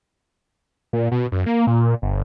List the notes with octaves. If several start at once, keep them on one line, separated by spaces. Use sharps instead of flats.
A#2
B2
F#2
A#3
A#2
G1